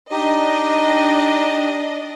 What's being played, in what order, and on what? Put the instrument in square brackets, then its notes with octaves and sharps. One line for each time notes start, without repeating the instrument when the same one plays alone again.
[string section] D4 D#5 [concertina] D#4 G4